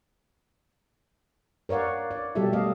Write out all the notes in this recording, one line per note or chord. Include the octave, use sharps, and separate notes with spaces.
A#4 C#5 D5 F5 F#5
D5
B2 F#3 G3 G4 A4 E5
G3 A3 D#5 F5